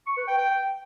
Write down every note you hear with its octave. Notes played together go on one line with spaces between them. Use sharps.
C#6
B4
G5
G5